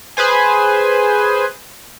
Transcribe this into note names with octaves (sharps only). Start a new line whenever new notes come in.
G#4 B4 C5 G#5